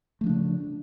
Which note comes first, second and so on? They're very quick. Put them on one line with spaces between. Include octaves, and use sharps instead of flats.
A3 F3 D4 C#3